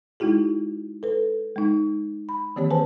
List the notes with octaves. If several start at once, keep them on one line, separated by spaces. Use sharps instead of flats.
G#3 D#4 E4 F#4 G#4
A4 B4
G#3 D#4
B5
D#3 E3 A#3 C4 G4 C#5
G#4 B4 C5 G#5 A5